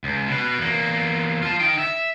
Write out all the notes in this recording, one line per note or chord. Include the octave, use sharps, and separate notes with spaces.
C#2
B2 B4
E2 A#3
F4 A5
D#4 G5
E5